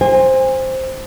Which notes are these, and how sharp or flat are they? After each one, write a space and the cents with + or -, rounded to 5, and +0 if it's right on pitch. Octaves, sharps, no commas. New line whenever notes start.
C5 +0 G#5 -35